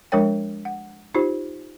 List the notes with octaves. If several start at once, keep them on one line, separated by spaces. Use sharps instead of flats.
F3 G#3 D4 A#4 C#5 G5
F#5
D#4 F4 G4 C5